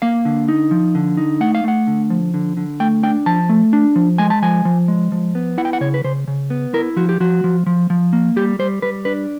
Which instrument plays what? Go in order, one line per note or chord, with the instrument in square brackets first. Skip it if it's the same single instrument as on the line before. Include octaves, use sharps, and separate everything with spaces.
[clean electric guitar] A#3 F5
D3
D#4
F3
D3
D#4
A3 F#5
F5
A3 F#5
D3
F3
D3
D3
A3 G5
D4 G5
F3 A5
A3
D4
F3
G#3 G#5
A5
F3 G#5
F3
G#3
F3
B3
E4 F#5
G5
F#5
C#3 C#5
B4
C#3 C5
C#3
B3
E4 A#4
F3 F#4
G4
F3 F#4
F3
F3
F3
A#3
G3 G4
G3 C5
G3 B4
D4 B4